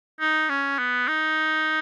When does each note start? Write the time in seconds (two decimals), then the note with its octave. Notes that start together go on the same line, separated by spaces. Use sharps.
0.20 D#4
0.49 C#4
0.78 B3
1.08 D#4